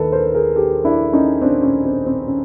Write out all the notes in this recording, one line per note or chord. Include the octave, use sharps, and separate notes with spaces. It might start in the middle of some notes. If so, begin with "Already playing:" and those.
Already playing: D#2 D#3 A4 B4
A#4 C5
G#4 A#4
G4 A4
D4 E4
C#4 D#4
C4 D4
C#4
C4
C4
C#4